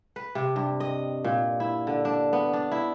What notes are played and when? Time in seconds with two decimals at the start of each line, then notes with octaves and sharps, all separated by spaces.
0.16 B4
0.35 C3
0.56 G2
0.80 D#5
1.24 A#2
1.60 E4
1.87 D3
2.05 D4
2.33 B3
2.53 D4
2.71 E4